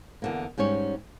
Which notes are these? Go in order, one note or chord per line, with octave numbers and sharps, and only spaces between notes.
E2 D3 A#3
G#2 G3 C#4 C#5